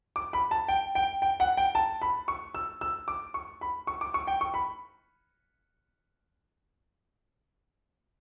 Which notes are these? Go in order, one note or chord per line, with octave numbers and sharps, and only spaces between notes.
D6
B5
A5
G5
G5
G5
F#5
G5
A5
B5
C#6
E6
E6
D6
C#6
B5
C#6
D6
C#6
G5
C#6
B5